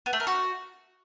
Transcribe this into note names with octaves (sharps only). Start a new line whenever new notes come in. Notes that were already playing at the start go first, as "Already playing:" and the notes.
B3
A3
A#4
F#4